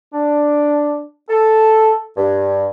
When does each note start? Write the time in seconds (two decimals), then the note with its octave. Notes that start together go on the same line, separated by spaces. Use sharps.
0.12 D4
1.29 A4
2.17 G2